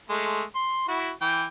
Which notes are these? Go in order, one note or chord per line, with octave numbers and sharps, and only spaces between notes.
G#3 A3
C6
E4 F#4
E3 G5